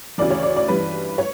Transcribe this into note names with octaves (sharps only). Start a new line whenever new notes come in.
D2 C#3 E3 D5
C#5
D5
D5
G2 E3 B4
C#5